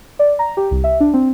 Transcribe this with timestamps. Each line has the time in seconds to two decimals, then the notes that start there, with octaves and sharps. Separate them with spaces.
0.19 D5
0.39 A#5
0.57 G4
0.71 C2
0.84 E5
1.00 D4
1.14 C4